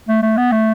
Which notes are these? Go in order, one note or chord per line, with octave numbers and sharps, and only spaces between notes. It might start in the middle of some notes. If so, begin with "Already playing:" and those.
A3
A3
B3
A3